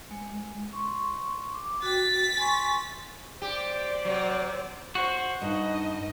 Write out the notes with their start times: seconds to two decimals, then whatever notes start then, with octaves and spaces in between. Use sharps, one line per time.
0.11 G#3
0.73 C6 C#6
1.54 D6
1.83 F#4 G5 A6 B6
2.37 G#5 C6 C#6
3.42 G4 C5 D5
4.05 C3 F#3
4.95 F#4 C5
5.42 G2 D#4 D#5